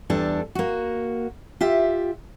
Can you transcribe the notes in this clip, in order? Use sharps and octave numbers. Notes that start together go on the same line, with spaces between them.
E2 G3 D4 A4
A#3 F#4
F4 G4 E5